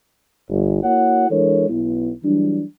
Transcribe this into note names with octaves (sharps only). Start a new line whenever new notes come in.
G1
A#3 E4 F#4 C#5 F#5
E3 G#3 D4 A4 A#4 C#5
B1 B3 E4
E3 F#3 G3 D4